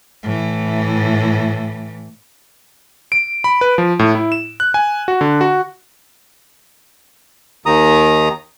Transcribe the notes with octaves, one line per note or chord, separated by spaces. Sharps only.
A2 E3
D7
B5
B4
F3
A2
E4
E7
F#6
G#5
F#4
D3
F#4
D#2 D#3 A#5 D#6